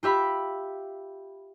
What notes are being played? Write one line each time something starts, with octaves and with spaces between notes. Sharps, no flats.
F4 G4 E5 B5